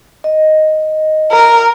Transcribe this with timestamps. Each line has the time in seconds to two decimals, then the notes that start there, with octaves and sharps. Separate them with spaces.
0.24 D#5
1.32 A#4